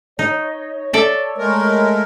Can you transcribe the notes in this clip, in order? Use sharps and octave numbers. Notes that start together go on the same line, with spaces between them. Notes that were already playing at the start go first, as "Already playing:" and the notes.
D#4 C#5
A4 D5 E5
G#3 A3 A#4